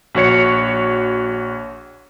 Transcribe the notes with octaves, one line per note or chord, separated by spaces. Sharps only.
A#1 F#4 C#5 C#7